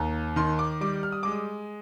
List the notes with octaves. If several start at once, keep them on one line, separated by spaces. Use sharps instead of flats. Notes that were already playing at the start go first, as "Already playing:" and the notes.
Already playing: D#2 A#5
D#3 C6
D6
G3 D6
F6
D#6
G#3 D6
D#6